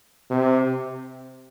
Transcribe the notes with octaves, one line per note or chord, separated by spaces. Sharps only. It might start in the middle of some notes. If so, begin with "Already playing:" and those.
C3